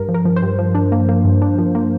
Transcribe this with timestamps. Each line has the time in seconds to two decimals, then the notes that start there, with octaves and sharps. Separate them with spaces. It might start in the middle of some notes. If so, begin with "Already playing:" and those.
Already playing: G2 A#4
0.09 F3
0.14 A#4
0.25 F3
0.36 C5
0.42 G2
0.59 F3
0.75 D4
0.92 A#3
1.09 A#3
1.25 G2
1.42 D4
1.58 F3
1.75 A#3